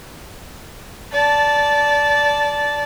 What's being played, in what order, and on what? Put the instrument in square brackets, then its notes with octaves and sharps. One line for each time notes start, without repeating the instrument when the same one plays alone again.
[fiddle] D5 A5